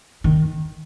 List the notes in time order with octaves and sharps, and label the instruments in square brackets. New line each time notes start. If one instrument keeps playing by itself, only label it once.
[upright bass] D#3